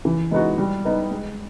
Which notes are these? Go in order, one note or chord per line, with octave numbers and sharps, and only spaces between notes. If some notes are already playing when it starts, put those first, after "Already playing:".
E3
G#3 B3 D#4 F#4
G3
B3 D#4
G#3